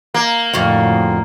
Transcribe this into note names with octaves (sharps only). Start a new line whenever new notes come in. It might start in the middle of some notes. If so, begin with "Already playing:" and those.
A#3
F2 A2 D3 F#4 F5